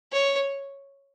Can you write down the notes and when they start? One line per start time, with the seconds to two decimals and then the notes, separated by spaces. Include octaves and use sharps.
0.12 C#5